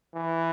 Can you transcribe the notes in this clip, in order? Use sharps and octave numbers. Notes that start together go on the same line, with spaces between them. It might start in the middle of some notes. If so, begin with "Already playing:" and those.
E3